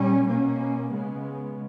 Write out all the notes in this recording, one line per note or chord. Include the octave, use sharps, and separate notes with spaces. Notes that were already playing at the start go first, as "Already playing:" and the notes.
Already playing: A#2 G3 C#4
B2 A#3 C#4
C#3 G#3 B3